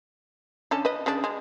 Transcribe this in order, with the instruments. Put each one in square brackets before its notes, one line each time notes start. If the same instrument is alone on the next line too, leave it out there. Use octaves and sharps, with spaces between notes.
[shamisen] D3 C#4 A4
B4 D#5
C#3 D4
G#3